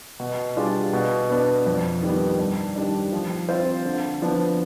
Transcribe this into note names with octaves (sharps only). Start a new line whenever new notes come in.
B2
G3 D4 F4 G#4
B2
B3 D4
F2
D#3 G3 B3
G2
D#3 G3 D4
F3
C4 F4 C5
D3
F3 B3 D4